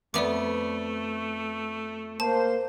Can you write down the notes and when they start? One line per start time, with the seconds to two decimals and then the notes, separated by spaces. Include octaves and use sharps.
0.14 F2 A3 B3 D5 E5 D6
2.20 A#3 C5 A5